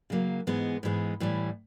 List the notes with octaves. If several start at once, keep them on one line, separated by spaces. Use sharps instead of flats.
C#3 F#3 A#3
G#2 E3 G#3 B3
G#2 E3 G#3 B3
A2 E3 G3